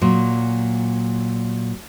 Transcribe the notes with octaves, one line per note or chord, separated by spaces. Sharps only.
A#2 F#3